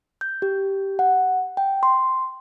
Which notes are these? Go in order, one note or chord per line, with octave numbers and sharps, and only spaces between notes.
G6
G4
F#5
G5
C6